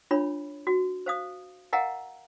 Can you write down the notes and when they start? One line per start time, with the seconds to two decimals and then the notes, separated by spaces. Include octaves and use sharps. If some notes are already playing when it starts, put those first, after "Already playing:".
0.11 D4 F4 C#5 B5
0.67 F#4
1.06 C5 F5 D#6
1.73 A#4 D#5 F5 F#5 G#5 A#5